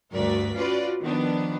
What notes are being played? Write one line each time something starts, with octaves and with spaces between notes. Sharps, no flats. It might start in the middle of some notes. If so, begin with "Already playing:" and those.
D2 G2 F#4 A#4 D5 B6
C#4 F4 F#4 B4 D5
D#3 F3 B3 D4